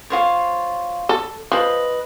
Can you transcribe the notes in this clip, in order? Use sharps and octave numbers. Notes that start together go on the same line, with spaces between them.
F4 C5 C#5
A4
F3 B4 D#5